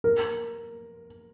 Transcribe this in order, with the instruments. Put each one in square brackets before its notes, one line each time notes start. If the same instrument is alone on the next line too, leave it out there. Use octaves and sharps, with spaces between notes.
[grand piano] A#4